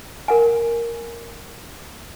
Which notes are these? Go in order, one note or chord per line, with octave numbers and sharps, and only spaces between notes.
A#4 F#5 G#5